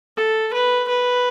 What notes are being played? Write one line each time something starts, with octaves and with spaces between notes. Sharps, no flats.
A4
B4
B4